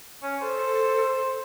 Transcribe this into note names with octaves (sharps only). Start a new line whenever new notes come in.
C#4
A4 C5